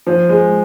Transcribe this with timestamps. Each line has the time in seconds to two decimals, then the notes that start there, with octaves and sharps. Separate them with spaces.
0.07 F3
0.29 G#3